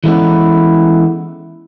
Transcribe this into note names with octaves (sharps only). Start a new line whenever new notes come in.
E3 G#3 A3 B3 C#4 E4